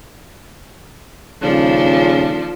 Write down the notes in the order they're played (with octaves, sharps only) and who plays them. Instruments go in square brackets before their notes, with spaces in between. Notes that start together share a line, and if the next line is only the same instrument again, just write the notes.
[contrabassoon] D#1 [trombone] C#3 [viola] F3 [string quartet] D4 A4